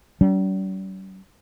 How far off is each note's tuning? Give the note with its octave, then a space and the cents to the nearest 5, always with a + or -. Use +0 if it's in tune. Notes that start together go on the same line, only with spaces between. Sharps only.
G3 -45 C#4 +45